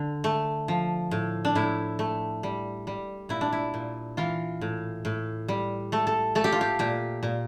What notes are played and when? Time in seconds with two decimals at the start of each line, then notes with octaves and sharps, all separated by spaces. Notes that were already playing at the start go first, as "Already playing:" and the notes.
Already playing: D3
0.24 A3
0.68 F3
1.11 A2
1.45 D4
1.55 A2 E4
1.99 A3
2.43 G3
2.87 G3
3.29 A#2 E4
3.41 D4
3.53 E4
3.74 A#2
4.17 E3 F4
4.61 A2
5.05 A2
5.48 G3
5.92 A3 A4
6.07 A4
6.35 A3 A4
6.44 G4
6.52 F4
6.61 G4
6.79 A#2 G4
7.23 A#2